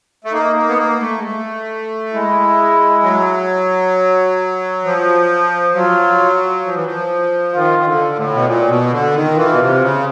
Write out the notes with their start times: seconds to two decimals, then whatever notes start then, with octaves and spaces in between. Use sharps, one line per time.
0.25 A3
0.33 A#3 D#4
0.56 A#3
0.69 B3
0.78 A#3
1.01 A3
1.19 G#3
1.23 A3
2.14 G#3 E4
3.04 F#3
4.85 F3
5.75 F#3 F4
6.65 F3
6.75 E3
6.85 F3
7.55 D#3 F4
7.79 D#3
7.86 D3
8.16 A2
8.34 B2
8.46 A#2
8.68 B2
8.91 D3
9.14 D#3
9.36 E3 F4
9.52 B2
9.59 C3
9.81 C#3